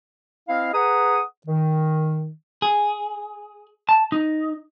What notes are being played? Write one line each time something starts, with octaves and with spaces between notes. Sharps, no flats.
C4 E4 D#5 F5
G#4 B4 F#5 A#5 D#6
D#3
G#4
A5
D#4